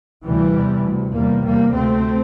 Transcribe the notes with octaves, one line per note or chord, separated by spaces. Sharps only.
D2 C3 E3 G3
E2 C3
D2 C3
E2 C3 G3 A#3
E2 C3 G3 A#3
D2 C3 A3 C4